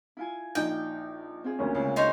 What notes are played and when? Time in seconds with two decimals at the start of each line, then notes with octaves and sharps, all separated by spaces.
0.17 E4 F4 G#5
0.55 A#1 D#4 G5
1.44 C4 F4 G#4
1.59 D2 A#3 C#4
1.75 C#2
1.96 D#4 C5 C#5